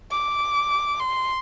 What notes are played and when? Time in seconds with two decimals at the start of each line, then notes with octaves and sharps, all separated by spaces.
0.11 D6
0.99 C6